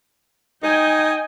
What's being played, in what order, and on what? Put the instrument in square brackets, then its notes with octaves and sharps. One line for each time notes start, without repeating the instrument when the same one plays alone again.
[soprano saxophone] D#4 [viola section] D#5 G5 G#5